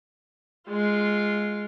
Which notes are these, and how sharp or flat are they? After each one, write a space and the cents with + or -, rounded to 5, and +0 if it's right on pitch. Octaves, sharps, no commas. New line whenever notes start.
G#3 +0 F4 -10